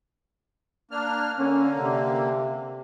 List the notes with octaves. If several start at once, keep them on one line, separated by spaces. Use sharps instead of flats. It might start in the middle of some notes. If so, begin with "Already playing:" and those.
A#3 D4 F6
D3 A#3 C#4
C3